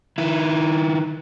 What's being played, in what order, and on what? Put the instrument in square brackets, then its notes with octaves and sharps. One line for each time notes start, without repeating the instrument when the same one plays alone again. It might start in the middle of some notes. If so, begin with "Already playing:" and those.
[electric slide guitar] D#3 E4